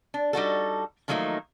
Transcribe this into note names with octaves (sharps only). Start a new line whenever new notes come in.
D4
G3 D#4 F#4 A4
D#3 F3 F#3 A3 A#3 D#4